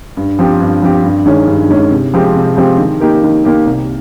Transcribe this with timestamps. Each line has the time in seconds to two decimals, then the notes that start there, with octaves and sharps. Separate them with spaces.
0.17 G2
0.39 F3 C4 G4
0.60 G2
0.82 F3 C4 G4
1.04 G2
1.26 D#3 G#3 C#4
1.47 G2
1.69 D#3 G#3 C#4
1.91 C3
2.14 F3 G#3 C4 G4
2.35 C3
2.57 F3 G#3 C4 G4
2.78 D#3
3.00 A#3 D#4 G4 A#4
3.23 D#3
3.44 A#3 D#4 G4 A#4
3.67 C2